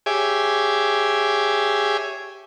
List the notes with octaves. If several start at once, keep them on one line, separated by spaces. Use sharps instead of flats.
G4 G#4 C#5 E5 G#5 D6